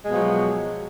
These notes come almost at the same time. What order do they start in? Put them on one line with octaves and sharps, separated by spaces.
G#3 B2 F3 F#3